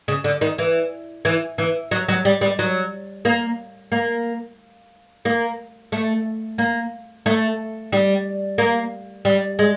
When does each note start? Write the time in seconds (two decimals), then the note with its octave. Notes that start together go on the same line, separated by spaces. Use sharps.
0.08 C#3
0.24 D3
0.41 D#3
0.58 E3
1.25 E3
1.58 E3
1.91 F#3
2.08 F#3
2.25 G3
2.41 G3
2.59 F#3
3.25 A#3
3.92 A#3
5.25 A#3
5.92 A3
6.58 A#3
7.26 A3
7.92 G3
8.58 A#3
9.25 G3
9.59 G#3